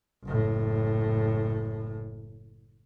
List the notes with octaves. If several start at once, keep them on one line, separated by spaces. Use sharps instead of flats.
F#1 A2